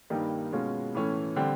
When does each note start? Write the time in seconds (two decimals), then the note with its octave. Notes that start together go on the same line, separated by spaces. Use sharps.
0.10 G2 D#3 G3 A#3 D#4
0.53 B2 G#3 C#4 F4
0.94 A2 E3 A3 C#4
1.36 D3 G3 C4